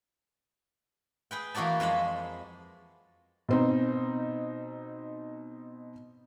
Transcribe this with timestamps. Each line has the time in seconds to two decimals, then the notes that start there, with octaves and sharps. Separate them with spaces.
1.31 G#4 B4 G5
1.55 E3 A#3 F#4 D5 A5
1.80 F2 G#3 A5 B5
3.49 B2 C4 D#4